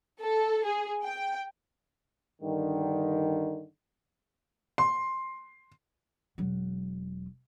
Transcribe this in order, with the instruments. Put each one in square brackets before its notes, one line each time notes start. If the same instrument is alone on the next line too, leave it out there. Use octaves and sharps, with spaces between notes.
[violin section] A4
G#4
G5
[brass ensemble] G2 D3 D#3
[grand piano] C6
[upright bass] E1 F#3